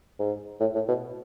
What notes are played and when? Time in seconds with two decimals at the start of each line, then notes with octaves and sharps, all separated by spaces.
0.19 G#2
0.60 A2
0.75 A2
0.89 B2